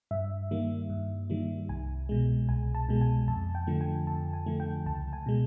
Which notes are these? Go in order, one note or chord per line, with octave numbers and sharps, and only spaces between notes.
G2 E5
D#3 G3 A#3
G2
D#3 G3 A#3
C2 G#5
B2 G#3
C2 G#5
A5
B2 G#3
G#5
F2 A5
G5
D3 F3 A3
G#5
F2 A5
G#5
D3 F3 A3
G5
C#2 A5
G#5
B2 G#3